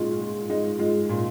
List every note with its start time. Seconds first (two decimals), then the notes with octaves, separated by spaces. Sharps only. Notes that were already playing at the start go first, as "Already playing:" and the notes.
Already playing: A#2 G#3 D#4 F4 F#4
0.21 G#3
0.49 G#3 D#4
0.79 G#3 F4
1.09 A#2